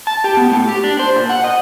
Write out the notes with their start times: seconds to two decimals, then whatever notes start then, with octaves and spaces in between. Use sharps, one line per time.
0.07 A5
0.24 G4
0.37 B3
0.50 A2
0.69 G4
0.84 D4
0.99 C5
1.16 A#2
1.30 F#5
1.44 D#5